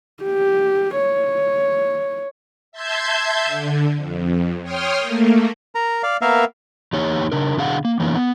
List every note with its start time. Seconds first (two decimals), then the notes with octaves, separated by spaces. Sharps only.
0.23 G4
0.97 C#5
2.72 E5 A5 C6 G6 G#6
3.46 D3
3.96 F2
4.63 C#5 G5 C6 D#6 F6
4.99 A3 A#3
5.75 A#4 A#5
6.03 D5 F5
6.21 A#3 B3 A#4 E5 F5
6.93 E2 A#3 D#4 G4 C#5
7.32 C#3 D4 A#4
7.57 B2 D3 D4 G#4 F5 F#5
7.85 A#3
8.00 E3 A#3 B3 C#4 D#4
8.15 B3